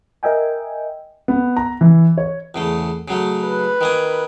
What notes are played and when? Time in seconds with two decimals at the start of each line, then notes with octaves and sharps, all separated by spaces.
0.23 A#4 D#5 E5 G5 G#5
1.28 B3
1.57 A#5
1.81 E3
2.18 C#5
2.54 E2 C#3 A3
3.08 C#3 F#3 A3
3.46 B4
3.81 D#3 A#3 G#5